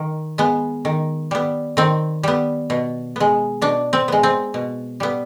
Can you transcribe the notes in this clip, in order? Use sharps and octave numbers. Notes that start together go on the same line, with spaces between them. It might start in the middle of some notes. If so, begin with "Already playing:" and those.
Already playing: D#3
G#3 B3
D#3
G3 B3
D#3 C4
G3 B3
B2
G#3 B3
B2 D4
C4
G#3 B3
C4
B2
G3 B3